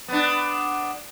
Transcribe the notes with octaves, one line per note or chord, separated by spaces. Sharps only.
B3 D4